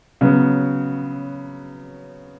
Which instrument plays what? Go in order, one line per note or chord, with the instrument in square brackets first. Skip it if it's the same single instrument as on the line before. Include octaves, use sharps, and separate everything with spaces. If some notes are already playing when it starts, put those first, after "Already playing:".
[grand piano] C#3 F#3 B3